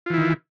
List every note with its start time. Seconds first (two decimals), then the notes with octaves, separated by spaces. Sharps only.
0.06 F4
0.10 E3
0.14 E4
0.18 D#3